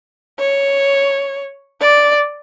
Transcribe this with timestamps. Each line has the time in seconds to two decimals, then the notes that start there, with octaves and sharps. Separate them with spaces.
0.39 C#5
1.81 D5